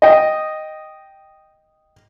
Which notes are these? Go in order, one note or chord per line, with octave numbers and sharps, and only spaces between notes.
D#5 G5